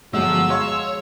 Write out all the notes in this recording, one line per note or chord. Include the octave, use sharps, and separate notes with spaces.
G1 F3 F#3 G#3 F#5 E6
G#3 C#5 F5 C6 G#6